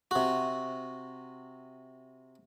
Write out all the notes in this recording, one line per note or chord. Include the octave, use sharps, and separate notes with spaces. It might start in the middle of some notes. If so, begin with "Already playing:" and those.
C3 F#4